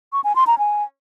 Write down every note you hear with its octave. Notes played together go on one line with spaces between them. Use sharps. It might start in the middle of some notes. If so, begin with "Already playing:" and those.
C#6
G#5
C6
A#5
G#5